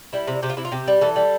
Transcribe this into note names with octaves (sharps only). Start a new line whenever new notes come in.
G3 E4
C3
C3 G4
F4
C3 E4
F4
C3 G4
G3
E3 A4
G3